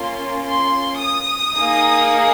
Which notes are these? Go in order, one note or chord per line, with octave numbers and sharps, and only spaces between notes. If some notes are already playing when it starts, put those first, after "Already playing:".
Already playing: A#3 C#4 F4 C6
C6
D#6
A#3 D#4 G#4